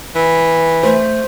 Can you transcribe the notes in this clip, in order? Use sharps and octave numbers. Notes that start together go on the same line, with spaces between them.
E3
A3 C5